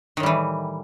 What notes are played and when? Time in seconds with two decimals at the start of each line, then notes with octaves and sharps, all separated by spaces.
0.17 D#3
0.20 A2
0.23 G3
0.26 E3